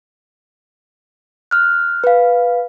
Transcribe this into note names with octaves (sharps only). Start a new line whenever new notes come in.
F6 F#6
B4 F5